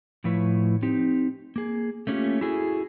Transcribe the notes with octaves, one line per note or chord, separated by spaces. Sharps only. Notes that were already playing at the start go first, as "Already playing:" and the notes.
A2 F3 E4 B4 C#5
C4 D#4 G4
A#3 G#4
A3 A#3 C#4 D#4 F4 G4
E4 F#4 G#4 A4